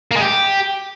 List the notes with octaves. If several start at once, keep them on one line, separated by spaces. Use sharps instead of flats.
A#3
G#3
G4